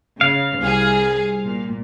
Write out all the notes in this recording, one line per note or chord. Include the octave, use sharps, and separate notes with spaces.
C#3 F5
C2 G#4
A#2